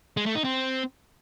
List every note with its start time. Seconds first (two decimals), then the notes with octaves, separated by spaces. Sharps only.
0.17 G#3
0.26 A3
0.35 D#4
0.44 C4